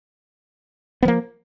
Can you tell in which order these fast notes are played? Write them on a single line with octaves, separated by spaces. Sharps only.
B3 F3 A#3